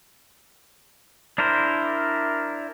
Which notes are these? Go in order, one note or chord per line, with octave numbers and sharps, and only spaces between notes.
D4 E4 A#4 C5